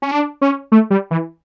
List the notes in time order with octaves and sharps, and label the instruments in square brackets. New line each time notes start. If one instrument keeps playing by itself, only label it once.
[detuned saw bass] C#4
D4
C#4
A3
G3
E3